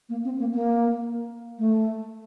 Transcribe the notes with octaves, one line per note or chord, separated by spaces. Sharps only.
A#3
C4
A#3
A#3
A3